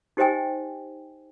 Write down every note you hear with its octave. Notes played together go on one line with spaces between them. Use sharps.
D#4 G4 C5 D#5 G5 G#5